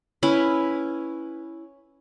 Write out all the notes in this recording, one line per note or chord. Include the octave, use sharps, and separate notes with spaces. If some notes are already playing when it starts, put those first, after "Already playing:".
C#4 E4 B4